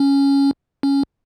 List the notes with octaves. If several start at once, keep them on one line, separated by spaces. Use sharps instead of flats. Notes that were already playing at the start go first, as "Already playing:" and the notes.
Already playing: C#4
C#4